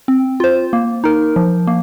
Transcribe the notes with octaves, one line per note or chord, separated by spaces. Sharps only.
C4
F4 C5
A#3
D#4 A#4
F3
A#3